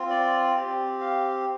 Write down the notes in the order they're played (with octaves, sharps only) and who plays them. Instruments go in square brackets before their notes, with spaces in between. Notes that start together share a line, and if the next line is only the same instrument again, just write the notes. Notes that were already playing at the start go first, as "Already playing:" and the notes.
Already playing: [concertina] C4 F4
D5
C4 G4
F5